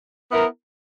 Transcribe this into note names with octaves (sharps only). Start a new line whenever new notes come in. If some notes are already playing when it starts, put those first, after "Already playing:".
B3 E4 A#4